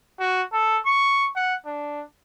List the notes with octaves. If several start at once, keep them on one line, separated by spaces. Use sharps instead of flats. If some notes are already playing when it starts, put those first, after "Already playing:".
F#4
A4
C#6
F#5
D4